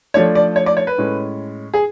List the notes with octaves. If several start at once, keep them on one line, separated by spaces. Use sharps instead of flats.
F3 A3 D4 C#5
D5
C#5
D5
C#5
B4
A2 G#3 C#4
G#4